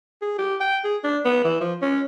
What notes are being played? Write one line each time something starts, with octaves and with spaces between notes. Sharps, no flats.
G#4
G4
G5
G#4
D4
B3
E3
F3
C#4